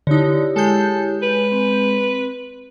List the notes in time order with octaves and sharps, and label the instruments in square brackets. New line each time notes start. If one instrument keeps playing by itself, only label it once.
[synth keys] D3 D#4 [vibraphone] E4 G4 C#5
[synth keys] G#3 G6 [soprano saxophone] A4
[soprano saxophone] B4
[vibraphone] C4